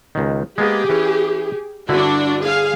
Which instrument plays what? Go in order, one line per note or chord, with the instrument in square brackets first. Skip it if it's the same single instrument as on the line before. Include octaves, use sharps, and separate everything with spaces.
[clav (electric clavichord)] C#2 D#3
[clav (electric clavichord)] G#3 A#3 B3 [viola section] G4 G#4
[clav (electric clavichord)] E3 C#4
[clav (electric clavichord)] G2 D3 E4 [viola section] D4 F#4
[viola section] G#4 F5